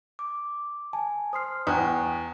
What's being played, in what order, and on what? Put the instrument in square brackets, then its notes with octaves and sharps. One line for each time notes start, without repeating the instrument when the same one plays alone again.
[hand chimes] D6
[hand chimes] G#5 [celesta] A5
[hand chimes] C5 C6 F6 [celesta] D#6 C7
[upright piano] E2 [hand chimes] G5 G#5 C#6 [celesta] D#6 F#6